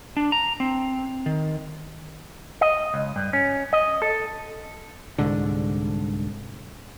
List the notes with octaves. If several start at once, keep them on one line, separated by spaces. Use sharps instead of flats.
D4
A#5
C4
D#3
D#5
C#2
G2
C#4
D#5
A4
C2 G#2 D3